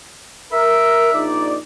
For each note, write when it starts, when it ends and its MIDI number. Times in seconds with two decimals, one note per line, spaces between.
0.53 1.09 70
0.53 1.25 76
1.13 1.56 34
1.13 1.56 63
1.13 1.56 74